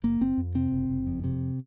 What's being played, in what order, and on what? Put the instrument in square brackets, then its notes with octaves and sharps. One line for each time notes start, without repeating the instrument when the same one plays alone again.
[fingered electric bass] F#1 A#3
F#1 C4
F2
C3 C4
F#1
F#1
F2
C3